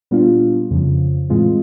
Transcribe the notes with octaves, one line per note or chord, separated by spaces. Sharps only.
A#2 G3 B3 D4 F4
F2 C#3 F3
A2 E3 G#3 C4 F4